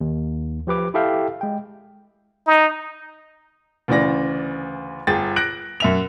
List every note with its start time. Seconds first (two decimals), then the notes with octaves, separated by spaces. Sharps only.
0.01 D#2
0.67 F3 G4 B4 D6
0.94 E4 G4 A4 E5 F5 G5
1.41 G#3 G5
2.46 D#4
3.88 D2 C#3 E3 D5 A#6
5.07 G1 G#4 G5 A6
5.36 F#6 A#6 D7 F#7
5.80 F#2 E5 F7